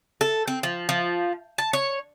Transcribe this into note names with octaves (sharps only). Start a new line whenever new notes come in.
A4
C4
F3
F3
A5
C#5